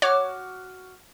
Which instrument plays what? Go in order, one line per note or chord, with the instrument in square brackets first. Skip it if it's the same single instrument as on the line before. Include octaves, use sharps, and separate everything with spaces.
[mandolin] F#4 D6 F6 [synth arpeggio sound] C#5